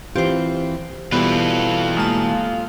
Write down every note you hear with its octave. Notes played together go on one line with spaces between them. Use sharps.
E3 C4 F4 G4 C5
B2 E3 G3 B3 F4 G4 A4
G#3 A#3 A5